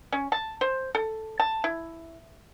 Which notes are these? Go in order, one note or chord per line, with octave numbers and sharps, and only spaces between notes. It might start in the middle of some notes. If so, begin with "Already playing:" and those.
C#4
A5
C5
A4
A5
E4